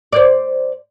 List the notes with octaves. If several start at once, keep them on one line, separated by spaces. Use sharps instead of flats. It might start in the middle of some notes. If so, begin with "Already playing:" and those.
C5 D5